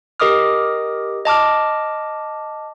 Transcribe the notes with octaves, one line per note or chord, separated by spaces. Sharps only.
G4 A#4 D#5 D6 D#6 F6
D#5 A5 D6 F6